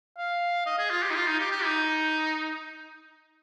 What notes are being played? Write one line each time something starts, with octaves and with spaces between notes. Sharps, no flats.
F5
D#5
G#4
F4
G4
D#4
F4
D#4
G4
G4
D#4